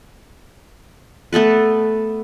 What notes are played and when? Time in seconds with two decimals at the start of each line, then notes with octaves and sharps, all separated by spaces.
1.33 A3 B3 A4 B4